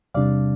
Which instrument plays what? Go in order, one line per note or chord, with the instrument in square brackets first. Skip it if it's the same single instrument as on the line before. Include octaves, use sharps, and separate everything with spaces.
[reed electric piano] E2 C3 G3 D4 D5 F5